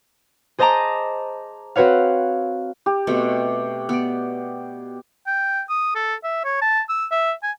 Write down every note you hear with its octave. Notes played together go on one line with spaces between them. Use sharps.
G#4 C5 D#5 A5 A#5 D6
C4 F#4 B4 C#5 F5
G4
B2 A3 C4
B3 D5
G5
D#6
A4
E5
C#5
A5
E6
E5
G#5